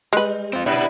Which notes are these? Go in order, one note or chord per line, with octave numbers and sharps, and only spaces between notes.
G3 G#3 B4
C4 F4
A#2 B3 D4 E4